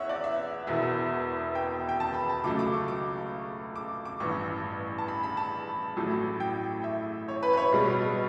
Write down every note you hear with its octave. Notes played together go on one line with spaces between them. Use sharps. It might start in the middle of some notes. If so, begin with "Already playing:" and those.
Already playing: E2 C#5 E5 F#5
D5
E5
E1 E2 B2 E5
G5
G5
A5
B5
A5
C#2 C#3 F#3 A3 D6
D6
C#6
D6
D6
D6
A1 G2 E3 C#6
A5
B5
B5
A5
A1 A2 F#3 A3
G5
E5
C#5
B4
B4
C#5
B1 B2 G3